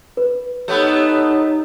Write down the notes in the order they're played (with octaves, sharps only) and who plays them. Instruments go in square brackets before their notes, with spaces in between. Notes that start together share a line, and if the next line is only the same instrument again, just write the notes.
[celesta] B4
[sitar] A3 B3 [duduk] D#4 [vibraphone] G4 C#5 E6